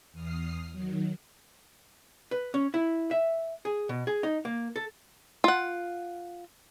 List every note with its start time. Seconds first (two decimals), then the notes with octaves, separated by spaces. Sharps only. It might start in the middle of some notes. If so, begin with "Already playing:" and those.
0.13 E2 D#6 F6 C7
0.72 D#3 F#3
2.31 B4
2.54 C#4
2.74 E4
3.11 E5
3.65 G#4
3.89 B2
4.07 G#4
4.23 D#4
4.45 A#3
4.76 A4
5.44 F4 F#5